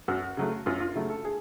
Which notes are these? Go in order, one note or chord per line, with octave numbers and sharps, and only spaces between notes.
F#2 F#4
C#3 F#3 A3
F#2 F4
F4
C#3 F#3 A3 E4
A4
G#4